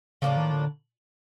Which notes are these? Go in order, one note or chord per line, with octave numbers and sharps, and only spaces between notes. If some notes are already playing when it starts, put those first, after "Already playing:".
A2 C#3 F3 A#3 D4
D#3
D3